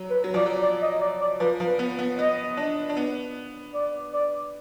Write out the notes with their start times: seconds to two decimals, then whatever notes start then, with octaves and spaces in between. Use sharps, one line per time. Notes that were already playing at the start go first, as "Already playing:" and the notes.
Already playing: F#3
0.11 B4
0.24 F#3
0.34 F3 D5
0.46 F#3
0.62 D5
0.82 D#5
1.01 D5
1.21 D5
1.40 F3 B4
1.60 F3
1.66 B4
1.79 B3
1.99 B3
2.18 B3 D#5
2.57 D4
2.89 D4
2.97 B3
3.74 D5
4.13 D5